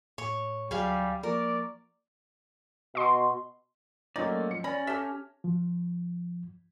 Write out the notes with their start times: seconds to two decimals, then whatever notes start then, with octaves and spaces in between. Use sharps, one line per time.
0.18 A2 C#5
0.71 D2 F#3 G3 G#4 F5 B6
1.23 F3 A#3 A#4 D5 C#6
2.95 B2 D#5 C6
4.16 F#3 A3 A#3 C#4 D#4 F4 D5
4.51 F3 C#7
4.64 C#4 D5 B5 A#6
4.87 G4 A4 E5 F6
5.44 F3